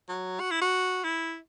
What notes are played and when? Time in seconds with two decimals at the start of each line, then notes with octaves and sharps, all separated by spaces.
0.09 F#3
0.40 F#4
0.51 E4
0.62 F#4
1.04 E4